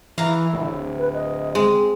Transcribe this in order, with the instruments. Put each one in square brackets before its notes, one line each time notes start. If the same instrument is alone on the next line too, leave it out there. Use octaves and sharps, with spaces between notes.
[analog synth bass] E3 [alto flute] E4 [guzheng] F5 A#5
[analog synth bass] D1
[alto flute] B4
D#5
[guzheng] G#3 [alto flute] C4